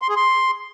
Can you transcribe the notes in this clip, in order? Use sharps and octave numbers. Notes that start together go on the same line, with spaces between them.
C6
G#4
C6